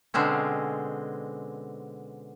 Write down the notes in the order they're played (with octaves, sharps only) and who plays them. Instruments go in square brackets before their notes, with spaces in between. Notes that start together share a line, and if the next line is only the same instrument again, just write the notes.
[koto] B2 D3 G#3 C4 C#4